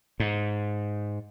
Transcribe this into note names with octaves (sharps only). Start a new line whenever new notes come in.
G#2